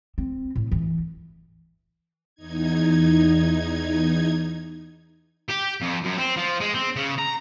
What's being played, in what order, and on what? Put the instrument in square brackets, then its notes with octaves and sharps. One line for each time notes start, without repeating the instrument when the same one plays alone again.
[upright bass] C4
A2
E3
[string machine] E2 D#4 G#6
[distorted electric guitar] G4
F2
F#2
C4
F3
G#3
C4
C#3
A#5